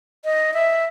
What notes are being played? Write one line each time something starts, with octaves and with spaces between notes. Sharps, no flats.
D#5
E5